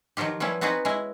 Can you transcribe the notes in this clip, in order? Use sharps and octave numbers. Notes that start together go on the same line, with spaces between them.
D#3 F3 F#3 F4 G4
F3 G3 B3 C#4 E4
B3 C4 D#4 F#4 G#4 B4
G#3 C#4 E4